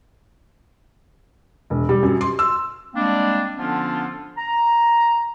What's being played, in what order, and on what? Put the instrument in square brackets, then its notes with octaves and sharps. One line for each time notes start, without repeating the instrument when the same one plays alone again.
[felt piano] E1
G3
F#2
C6
E6
[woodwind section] G3 G#3 A#3 C4 D4
D3 F3 B3 C#4 D4 F4
A#5